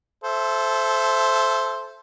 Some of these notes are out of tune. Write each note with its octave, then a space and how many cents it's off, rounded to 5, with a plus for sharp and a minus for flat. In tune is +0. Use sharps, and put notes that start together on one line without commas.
A4 -20 C5 +0 E5 +15